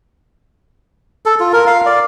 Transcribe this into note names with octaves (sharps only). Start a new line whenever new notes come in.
A4
F4
A#4
F5
D5